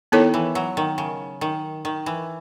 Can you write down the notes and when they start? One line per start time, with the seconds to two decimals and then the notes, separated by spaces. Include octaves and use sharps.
0.12 D#3 B3 E4 A4 C#5
0.34 E3
0.55 F#3
0.77 D#3
0.98 C#3
1.41 D#3
1.85 D#3
2.06 E3